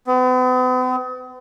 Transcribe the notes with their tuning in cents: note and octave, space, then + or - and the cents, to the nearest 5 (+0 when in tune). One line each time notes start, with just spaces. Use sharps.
B3 +45